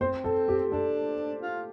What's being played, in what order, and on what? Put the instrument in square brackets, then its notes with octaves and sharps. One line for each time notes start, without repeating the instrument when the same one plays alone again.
[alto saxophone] C4 [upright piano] C5
[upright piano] A4
G4
[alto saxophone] D4 [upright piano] A4
[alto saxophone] F4